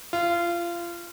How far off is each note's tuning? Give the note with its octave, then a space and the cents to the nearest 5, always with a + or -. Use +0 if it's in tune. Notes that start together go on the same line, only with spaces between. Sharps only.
F4 -25